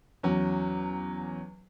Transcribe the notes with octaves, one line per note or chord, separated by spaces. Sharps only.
E2 F#3 C#4